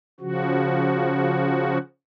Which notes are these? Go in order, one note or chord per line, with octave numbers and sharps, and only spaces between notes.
C#3 F3 F#4